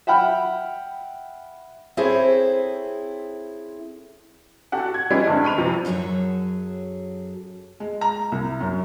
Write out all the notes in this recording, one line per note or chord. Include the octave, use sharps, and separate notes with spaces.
E5 F#5 G5 B5 F6
C4 E4 G#4 A4 C5 C#5
F#4 G4 A4 F#5
G#6
G3 G#3 C#4 E4 B4
G2 D3 C4
G#3 B5 C#6 D#7 F7
F#2 C3 F3 B4
F#2 F#3 G#4 A4 C#5
G#3
A#5
C2
F#2